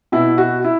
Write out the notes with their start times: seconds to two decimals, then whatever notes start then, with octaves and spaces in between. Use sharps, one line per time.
0.12 B2 E4
0.38 F#4
0.64 E4